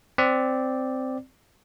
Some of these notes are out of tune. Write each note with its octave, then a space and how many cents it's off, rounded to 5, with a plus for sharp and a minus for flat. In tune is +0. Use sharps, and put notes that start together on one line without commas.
C4 -5 D5 +0